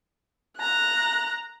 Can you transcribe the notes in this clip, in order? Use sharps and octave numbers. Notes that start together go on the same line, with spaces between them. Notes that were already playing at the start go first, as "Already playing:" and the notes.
A#5 F#6